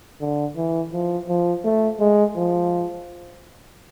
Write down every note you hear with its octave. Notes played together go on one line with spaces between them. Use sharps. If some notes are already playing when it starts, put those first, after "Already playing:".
D3
E3
F3
F3
A3
G#3
F3